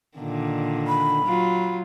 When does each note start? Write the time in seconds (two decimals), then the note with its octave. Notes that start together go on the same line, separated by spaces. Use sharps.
0.17 A#2 D3 D#3
0.87 B5
1.25 F#3 F4